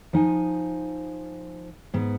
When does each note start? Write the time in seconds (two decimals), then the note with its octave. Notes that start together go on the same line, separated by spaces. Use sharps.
0.13 F3 D#4 G#5
1.94 G#2 B3